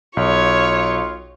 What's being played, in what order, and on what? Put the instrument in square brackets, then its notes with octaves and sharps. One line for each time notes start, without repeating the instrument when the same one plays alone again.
[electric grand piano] B1 [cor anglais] F4 [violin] C#5